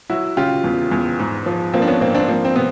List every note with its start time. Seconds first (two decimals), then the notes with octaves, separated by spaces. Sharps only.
0.10 F#3 E4 F#4
0.37 C#3 F4 G4
0.64 E2
0.91 E2
1.19 G#2
1.46 F3
1.74 F3 A#3 C4
1.82 D4
1.88 B3 C#4
2.01 G#2 A#3 C4
2.14 C4 D4
2.28 F3 A#3 C4
2.45 C4
2.56 C3 B3